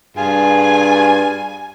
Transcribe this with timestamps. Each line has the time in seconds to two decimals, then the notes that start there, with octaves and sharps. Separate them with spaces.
0.17 G2 F4 G#4 G#5